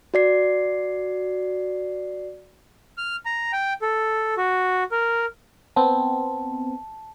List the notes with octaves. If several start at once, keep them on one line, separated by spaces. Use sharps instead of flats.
F#4 D5 C7
F6
A#5
G5
A4
F#4
A#4
B3 C4 A5